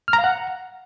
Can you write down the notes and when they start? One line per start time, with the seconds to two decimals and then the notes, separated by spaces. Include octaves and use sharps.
0.08 F6
0.13 A#5
0.19 F5
0.24 F#5